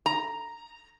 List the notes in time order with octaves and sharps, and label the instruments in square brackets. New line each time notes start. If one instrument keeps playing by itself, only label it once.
[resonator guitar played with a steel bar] A#5